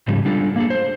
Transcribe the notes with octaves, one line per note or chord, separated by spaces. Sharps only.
G#2 C#3 F3 G3
G3 D4 F4 A4
A#3 D4 F#4 G#4 A4
C5